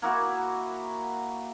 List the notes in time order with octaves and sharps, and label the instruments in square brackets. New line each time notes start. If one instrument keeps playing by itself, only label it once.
[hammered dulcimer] A#3 E4 F#4 G#4